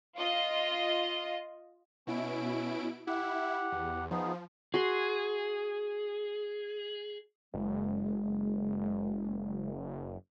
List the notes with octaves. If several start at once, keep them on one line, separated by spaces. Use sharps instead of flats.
F4 D#5
B2 C#4 E4 D7
E4 G4 F#5
E2
F3 B3 D#4 G#4
F#4 G#4 C6
F#1 G#3